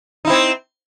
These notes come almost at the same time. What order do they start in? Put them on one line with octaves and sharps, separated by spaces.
D#4 E4 C4